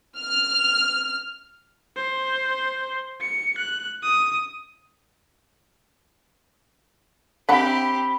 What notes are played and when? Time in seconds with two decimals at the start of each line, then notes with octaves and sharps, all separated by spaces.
0.18 F6
1.97 C5
3.21 C#7
3.58 F#6
4.03 D#6
7.49 C4 D4 G4 F#5 A#5 B5